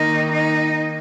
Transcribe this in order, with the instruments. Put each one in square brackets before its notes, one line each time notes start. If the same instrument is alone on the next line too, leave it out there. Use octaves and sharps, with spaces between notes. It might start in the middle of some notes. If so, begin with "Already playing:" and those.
Already playing: [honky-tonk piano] D#3 A#3 [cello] D#4
[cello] D#4